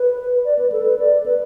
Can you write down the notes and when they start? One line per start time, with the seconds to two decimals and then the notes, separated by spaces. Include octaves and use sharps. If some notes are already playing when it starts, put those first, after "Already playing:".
Already playing: B4
0.45 D5
0.59 B4
0.72 A4
0.85 B4
0.99 D5
1.26 B4